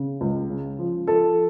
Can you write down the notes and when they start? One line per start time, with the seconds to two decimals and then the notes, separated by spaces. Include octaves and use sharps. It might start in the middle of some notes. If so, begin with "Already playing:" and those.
Already playing: C#3
0.21 C#2
0.49 C#3
0.79 F3
1.07 F3 A4